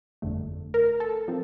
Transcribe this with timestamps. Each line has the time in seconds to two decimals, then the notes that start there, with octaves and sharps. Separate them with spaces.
0.22 G1 F2 D3 A3
0.74 A#4
1.00 A4
1.28 F3 C4